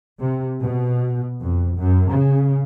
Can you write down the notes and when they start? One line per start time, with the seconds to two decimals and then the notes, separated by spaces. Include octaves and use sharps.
0.19 C3
0.58 B2
1.40 F2
1.76 F#2
2.07 C#3